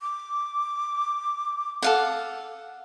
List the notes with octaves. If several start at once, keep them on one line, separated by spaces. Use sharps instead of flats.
D6
A4 F5 F#5